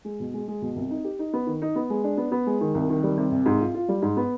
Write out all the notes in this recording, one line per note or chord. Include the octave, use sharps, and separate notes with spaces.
G#3
B2
G#3
G#3
B2
C2
D#4
G4
D#4
B3
D#3
D#4
B3
G#3
D4
B3
B3
G#3
D#3
C2
D#3
G3
C3
C2
G#2
F4
F4
G3
G#2
B3